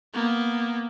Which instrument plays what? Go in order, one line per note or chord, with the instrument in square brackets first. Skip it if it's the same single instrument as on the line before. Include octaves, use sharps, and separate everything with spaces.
[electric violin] A#3 B3